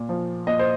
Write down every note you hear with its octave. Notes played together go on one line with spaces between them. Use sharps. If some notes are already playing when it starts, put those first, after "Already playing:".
Already playing: A#2
F3
A#2 D#5
C5